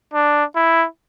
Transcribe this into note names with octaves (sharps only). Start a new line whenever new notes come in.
D4
E4